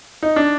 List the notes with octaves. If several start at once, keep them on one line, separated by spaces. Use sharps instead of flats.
D#4
D4